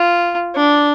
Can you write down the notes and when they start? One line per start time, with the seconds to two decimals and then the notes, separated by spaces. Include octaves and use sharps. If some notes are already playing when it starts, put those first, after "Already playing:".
Already playing: F4
0.56 D4